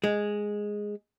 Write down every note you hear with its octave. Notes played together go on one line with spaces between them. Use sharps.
G#3